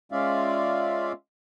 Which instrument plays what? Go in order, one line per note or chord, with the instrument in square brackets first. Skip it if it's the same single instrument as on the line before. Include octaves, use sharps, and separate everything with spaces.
[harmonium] G#3 C#4 F4 D5 E5 F5